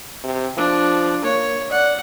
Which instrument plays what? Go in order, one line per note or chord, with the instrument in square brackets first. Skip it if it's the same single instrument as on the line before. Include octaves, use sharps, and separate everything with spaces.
[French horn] C3
[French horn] F3 [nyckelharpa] D4
[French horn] A#3 [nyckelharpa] C#5
[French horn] D5 [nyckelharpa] F#5